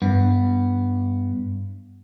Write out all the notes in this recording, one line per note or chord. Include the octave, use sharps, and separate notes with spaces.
G2 B3